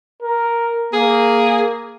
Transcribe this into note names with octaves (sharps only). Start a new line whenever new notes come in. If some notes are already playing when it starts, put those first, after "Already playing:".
A#4
A#3 G#4